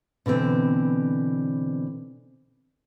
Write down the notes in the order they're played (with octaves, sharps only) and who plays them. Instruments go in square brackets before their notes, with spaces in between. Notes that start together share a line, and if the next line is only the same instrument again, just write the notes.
[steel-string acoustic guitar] B2 D3 E3 C4